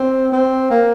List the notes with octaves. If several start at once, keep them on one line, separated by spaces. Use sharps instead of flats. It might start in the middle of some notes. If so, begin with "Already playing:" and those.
Already playing: C4
C4
A#3